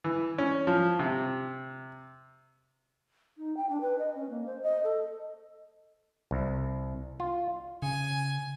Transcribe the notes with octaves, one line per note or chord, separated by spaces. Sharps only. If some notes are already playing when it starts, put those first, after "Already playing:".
E3
C#4
F3
C3
D#4
G5
D4
B4
D#5
C#4
A#3
C5
D#5
A4
C2
F4
C#3 G#5